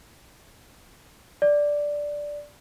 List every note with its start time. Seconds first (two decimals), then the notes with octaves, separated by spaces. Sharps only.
1.42 D5